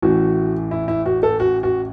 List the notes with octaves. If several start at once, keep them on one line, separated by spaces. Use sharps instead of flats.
A1 A2 E3 F#4
E4
E4
F#4
A4
F#4
F#4